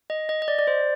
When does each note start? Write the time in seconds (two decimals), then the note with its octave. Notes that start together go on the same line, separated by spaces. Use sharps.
0.10 D#5
0.29 D#5
0.42 D#5
0.48 D5
0.59 D5
0.67 C5